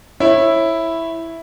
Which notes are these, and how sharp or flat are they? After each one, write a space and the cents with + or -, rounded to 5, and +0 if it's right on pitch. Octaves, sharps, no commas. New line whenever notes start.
E4 +0 C#5 -25